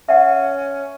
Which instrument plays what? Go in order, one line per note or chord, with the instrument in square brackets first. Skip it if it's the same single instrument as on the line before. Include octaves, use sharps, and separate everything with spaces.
[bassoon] C#4 [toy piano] E5 F#5